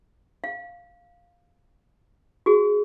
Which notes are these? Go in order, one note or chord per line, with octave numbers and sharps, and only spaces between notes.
F5
F#4 G#4